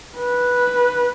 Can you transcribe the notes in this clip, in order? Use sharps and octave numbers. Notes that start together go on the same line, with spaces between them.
B4